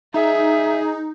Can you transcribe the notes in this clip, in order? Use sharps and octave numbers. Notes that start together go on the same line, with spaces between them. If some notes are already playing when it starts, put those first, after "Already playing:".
D#4 G#4 E5